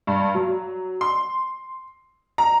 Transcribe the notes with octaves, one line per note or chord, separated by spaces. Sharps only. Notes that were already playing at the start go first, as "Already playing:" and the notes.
G2
F#3
C6
A#5